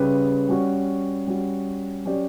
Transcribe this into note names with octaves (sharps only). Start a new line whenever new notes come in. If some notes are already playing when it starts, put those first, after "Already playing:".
Already playing: C#3 G3 C#4 G4 B4
G3 C#4 F#4
G3 C#4 F#4
F#3 C#4 G4 D5